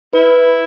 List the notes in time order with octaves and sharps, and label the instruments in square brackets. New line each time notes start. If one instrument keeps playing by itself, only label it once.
[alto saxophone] E4 [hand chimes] B4